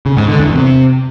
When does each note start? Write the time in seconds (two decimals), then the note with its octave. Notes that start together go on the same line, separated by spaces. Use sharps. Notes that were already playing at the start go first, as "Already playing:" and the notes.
0.06 C#3
0.17 G#2
0.28 D3
0.39 E2
0.51 C3